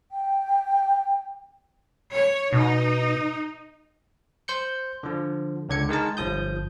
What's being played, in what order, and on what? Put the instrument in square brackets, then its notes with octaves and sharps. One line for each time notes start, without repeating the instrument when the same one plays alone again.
[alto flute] G5
[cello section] C#5
[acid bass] B2 [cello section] D#4
[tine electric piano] C5 G6 C#7
D3 F3
C#2 D3 G#6 C#7
D#3 G#3 A#4 A5
G1 F3 D#6 G6